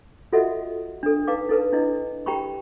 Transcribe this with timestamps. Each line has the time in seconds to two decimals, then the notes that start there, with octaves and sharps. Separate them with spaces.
0.33 F4 F#4 A4 D#5 E5 F#5
1.03 D4 A4
1.27 D#4 B4 F5 D6
1.49 D#4 A4 B4 A5
1.72 D4 E4 D#5
2.26 G4 G5 A#5 B5 C#6